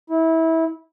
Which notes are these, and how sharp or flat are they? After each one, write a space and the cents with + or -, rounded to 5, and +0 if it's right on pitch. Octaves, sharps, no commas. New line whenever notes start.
E4 -25